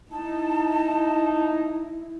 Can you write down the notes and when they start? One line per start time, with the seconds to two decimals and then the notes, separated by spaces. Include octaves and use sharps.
0.12 D#4 E4 A5